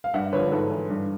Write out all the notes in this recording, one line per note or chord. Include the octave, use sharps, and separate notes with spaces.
F5
G2 E5 F#5
D3 F3 B4 C#5
G#2 A4 B4
E3
G2